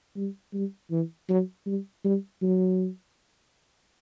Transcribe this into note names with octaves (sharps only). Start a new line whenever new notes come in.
G3
G3
E3
F#3
G3
G3
F#3